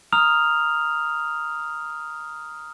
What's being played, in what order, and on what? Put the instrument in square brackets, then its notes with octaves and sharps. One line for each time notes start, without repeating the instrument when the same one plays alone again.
[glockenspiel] A#5 D#6 F6 F7